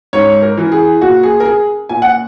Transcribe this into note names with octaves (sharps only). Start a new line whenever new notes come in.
G#2 C#5
A#4
E3
G#4
A#2 F#4
G#4
A#4
G#4
A#2 G#5
F#5